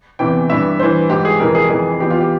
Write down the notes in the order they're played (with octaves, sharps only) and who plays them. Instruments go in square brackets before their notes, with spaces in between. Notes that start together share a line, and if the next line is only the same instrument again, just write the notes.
[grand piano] E2 C3 E3 G5
G2 E3 E5
G2 E3 C5
G#2 E3 G4
G#4
F2 C3 E3 A#4
G#4
F2 E3 G#4
E2 E3 G4
F4
G4